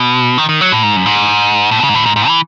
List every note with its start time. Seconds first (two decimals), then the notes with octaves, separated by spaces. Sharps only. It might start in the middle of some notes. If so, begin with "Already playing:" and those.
Already playing: B2
0.38 D#3
0.49 D#3
0.61 F#3
0.72 A2
0.83 G#2
0.96 F#2
1.06 G#2
1.71 A2
1.80 B2
1.84 C#3
1.89 G#2
1.94 A2
2.06 G#2
2.16 G#2
2.28 E3